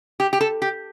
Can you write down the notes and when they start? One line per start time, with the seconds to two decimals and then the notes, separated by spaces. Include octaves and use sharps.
0.20 G4
0.33 G4
0.41 A4
0.62 G4